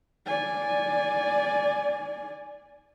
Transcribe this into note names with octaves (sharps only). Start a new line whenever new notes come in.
D5 G#5